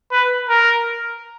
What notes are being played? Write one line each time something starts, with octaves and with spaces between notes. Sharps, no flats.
B4
A#4